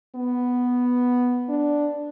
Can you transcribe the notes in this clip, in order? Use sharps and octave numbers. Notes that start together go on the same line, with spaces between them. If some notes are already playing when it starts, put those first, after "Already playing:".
B3
D4